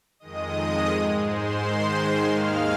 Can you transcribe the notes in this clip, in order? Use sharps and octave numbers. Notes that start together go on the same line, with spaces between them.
F2 D#3 G#3 D#5 D#6
G#2 G#3
C5 C6
G#2 D#3 G#3
D#2 D#3 G#3 F5 F6